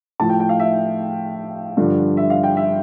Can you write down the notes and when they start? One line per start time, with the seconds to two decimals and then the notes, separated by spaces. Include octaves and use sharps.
0.20 A2 F3 A5
0.30 G5
0.40 G5
0.49 F5
0.60 E5
1.77 G2 D3 F3
2.17 E5
2.30 F5
2.43 G5
2.57 E5